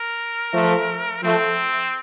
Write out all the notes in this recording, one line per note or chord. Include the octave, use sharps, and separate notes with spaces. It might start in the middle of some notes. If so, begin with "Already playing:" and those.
Already playing: A#4
F3 A3
F3 A3 C4